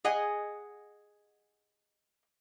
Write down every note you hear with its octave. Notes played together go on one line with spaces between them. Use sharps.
G#4 D#5 F#5 G#5